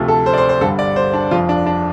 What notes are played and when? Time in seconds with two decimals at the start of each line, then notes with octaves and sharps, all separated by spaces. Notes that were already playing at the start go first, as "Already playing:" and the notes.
Already playing: D2 C3 F3 A3
0.08 A4
0.26 C5
0.33 D5
0.38 C5
0.49 C5
0.61 G1 G2 D3 G3 A4
0.79 D5
0.96 C5
1.14 D4
1.31 F1 F2 F3 F4
1.49 D4
1.66 D4